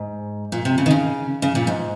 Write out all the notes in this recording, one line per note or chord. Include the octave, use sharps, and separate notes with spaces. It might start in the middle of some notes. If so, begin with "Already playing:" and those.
Already playing: G#2
A#2
C3
C#3
D#3
C#3
C#3
A#2
G#2